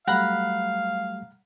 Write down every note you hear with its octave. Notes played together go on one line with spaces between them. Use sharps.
F#3 G3 A3 F5 F#5 A#5 B5